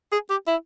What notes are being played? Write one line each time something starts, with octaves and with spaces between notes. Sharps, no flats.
G#4
G4
E4